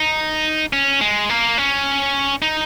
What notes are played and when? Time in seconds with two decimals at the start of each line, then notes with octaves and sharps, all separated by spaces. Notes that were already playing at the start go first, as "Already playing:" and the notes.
Already playing: D#4
0.73 C#4
1.01 G#3
1.30 A#3
1.58 C#4
2.42 D#4